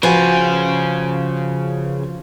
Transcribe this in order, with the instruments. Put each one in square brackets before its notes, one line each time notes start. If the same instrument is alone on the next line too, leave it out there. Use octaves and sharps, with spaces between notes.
[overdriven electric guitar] C#3 G#5 [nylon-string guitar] F3 [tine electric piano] F#4 B4